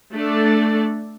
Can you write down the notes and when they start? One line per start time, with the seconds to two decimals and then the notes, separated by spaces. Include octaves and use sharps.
0.13 A3 D4 A4 D5